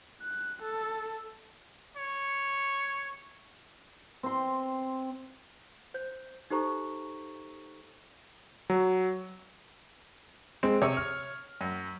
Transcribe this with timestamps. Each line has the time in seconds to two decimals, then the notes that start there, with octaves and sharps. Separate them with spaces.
0.22 F#6
0.63 A4
1.97 C#5
4.23 C4 C6
5.94 C5 G6
6.50 D#4 G4 A4 C5 A#5 C#6
8.70 F#3
10.63 G#3 C4
10.82 C3 C#5
10.97 F6
11.61 F#2